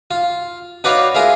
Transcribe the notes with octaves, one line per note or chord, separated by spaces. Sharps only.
F4
D#4 F#4 B4 C#5 D5 F5
F4 G#4 A#4 E5 F5